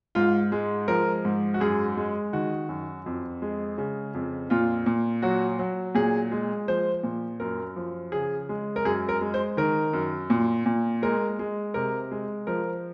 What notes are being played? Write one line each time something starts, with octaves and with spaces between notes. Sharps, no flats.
G#2 F4
G#3
F3 A#4
G#2
F#4
F#2 G#4
G#3
D#3 F#4
F#2
F2
G#3
C#3
F2
A#2 F4
A#2
F#3 F#4
F#3
A#2 G#4
G#3
F3 C5
A#2
F#2 A#4
F3
C#3 G#4
G#3
A#4
F#2 G#4
A#4
G#3
C5
D#3 A#4
F#2
A#2
A#2
G#3 A#4
G#3
C3 A#4
G#3
F3 A#4